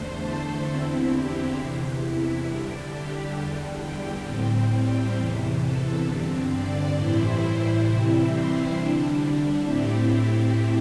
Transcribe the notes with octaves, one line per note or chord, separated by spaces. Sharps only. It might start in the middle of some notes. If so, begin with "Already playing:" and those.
Already playing: E2 D3 A3 C5
A4
E2 D3 C4 E4
G4
E2 C3 E3
E4
D3 G3 D4
G4
E2 D3 G3
G4
A2 G3 C4
G4
E2 C3 E3
A4
G2 D3 C4
D5
A2 E3 G3 E4 C5
C5
C3 E3 G3 C4 E4
C5
D3 G3 D4
A2 A3 C4 E4 G4